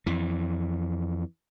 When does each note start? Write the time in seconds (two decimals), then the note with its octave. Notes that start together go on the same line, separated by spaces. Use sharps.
0.06 F2 E3